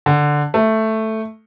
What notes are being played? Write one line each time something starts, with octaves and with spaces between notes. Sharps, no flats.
D3
A3